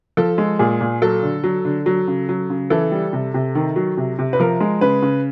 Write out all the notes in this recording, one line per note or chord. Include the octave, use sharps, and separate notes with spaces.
F3 A4
G#3
A#2 G#4
A#2
F#3 A4
D3
F#3
D3
F#3
C#3
F#3
C#3
E3 A4
G3
C3
C3
D#3
F#3
C3
C3
B4
F3 A#4
G#3
C#3 B4
C#3